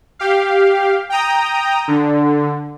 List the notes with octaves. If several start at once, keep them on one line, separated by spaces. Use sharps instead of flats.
G4 F5
G5 A#5 D#6
D3